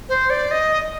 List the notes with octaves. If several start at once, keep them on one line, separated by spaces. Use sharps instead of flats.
C5
D5
D#5